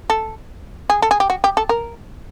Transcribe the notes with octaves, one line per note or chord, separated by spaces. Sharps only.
A4
G#4
A4
G#4
G4
F#4
G4
A4
A#4